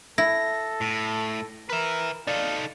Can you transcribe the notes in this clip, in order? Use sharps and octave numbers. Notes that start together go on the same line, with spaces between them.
E4 A4 A#6
A2
A#4 B4 E5
D#4 A4 D5 F5